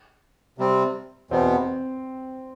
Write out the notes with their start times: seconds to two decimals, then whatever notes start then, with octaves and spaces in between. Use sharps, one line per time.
0.58 C3 G3 C4
1.31 E2 B2 B3 C4